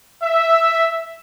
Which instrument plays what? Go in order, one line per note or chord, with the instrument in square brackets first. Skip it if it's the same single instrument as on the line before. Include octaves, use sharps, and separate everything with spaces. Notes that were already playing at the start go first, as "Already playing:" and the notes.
[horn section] E5